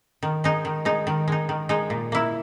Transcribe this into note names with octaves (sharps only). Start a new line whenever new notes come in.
D#3
G#3 D#4
D#3
G#3 D#4
D#3
G#3 D#4
D#3
G#3 D#4
A#2
A#3 E4